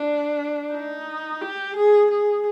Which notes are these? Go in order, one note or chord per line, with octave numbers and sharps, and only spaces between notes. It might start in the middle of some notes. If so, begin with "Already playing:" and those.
Already playing: D4
D#4
G4
G#4
G#4